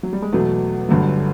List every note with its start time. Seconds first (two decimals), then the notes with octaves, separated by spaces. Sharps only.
0.03 F#3
0.13 G3
0.22 G#3
0.33 E2 B2 F#3 A3
0.89 G1 G2 D3 F#3